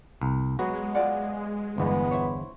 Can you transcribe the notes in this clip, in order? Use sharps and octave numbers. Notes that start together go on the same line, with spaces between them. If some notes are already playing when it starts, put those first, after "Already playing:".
C2
F#3 G#3 B3 F#4
F4 D5 F#5
G1 E2 B3
E4 C5 C#5